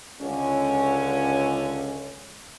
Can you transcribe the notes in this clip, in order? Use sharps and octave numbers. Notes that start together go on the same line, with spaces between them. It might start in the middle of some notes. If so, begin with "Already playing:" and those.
C#2 D3 C#4